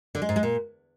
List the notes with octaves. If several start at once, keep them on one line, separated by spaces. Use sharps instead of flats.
D3
G#3
G#2
G#3
A#2